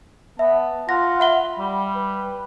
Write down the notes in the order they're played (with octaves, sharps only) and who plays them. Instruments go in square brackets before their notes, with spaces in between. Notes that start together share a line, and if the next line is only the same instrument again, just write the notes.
[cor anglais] B3 [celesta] E5 [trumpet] A5
[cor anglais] F4 [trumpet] F#5 [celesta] A#6
[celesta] E5 F#5 G7 [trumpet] B5
[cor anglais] G3
[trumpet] B4